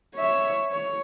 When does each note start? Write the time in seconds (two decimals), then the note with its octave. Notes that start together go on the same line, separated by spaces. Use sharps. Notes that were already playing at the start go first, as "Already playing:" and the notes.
0.15 C#5 E5
0.71 C#5